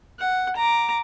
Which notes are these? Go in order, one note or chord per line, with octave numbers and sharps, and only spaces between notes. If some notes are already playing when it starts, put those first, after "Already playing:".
F#5
A#5 D6